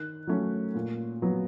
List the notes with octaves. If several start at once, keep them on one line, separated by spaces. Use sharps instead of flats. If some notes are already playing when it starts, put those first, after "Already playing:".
Already playing: D#3 F#6
F#3 A3 C#4
A#2
F#3 B3